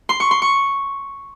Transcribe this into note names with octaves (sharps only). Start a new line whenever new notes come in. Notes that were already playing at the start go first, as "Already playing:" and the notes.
C6
C#6
C6
C#6